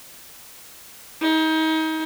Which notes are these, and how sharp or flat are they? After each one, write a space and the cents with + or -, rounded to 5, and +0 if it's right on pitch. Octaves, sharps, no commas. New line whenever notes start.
D#4 +30 G#4 +5